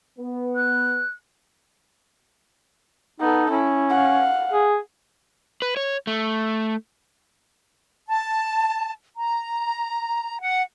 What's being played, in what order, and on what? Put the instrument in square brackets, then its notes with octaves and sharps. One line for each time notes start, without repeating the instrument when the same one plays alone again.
[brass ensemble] B3
[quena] F#6
[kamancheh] B3 A4 [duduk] D#4
[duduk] C#4 [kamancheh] E4
[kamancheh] F5 F#5
[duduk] G#4
[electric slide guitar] B4
C#5
A3
[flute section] A5
A#5
F#5